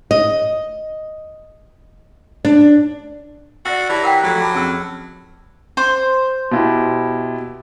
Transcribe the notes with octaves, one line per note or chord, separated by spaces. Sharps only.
D#5
D4
F#4 D5 F#5 E6 A6 A#6 C7
E3 G4 C#5 D5 A5 A#6
A#4 F#5 G5 A#5 E6 B6
F3 F#3 A3
A5 B5 D6
F2 C#4 G#4 E6 F6
C5
B2 E4 G4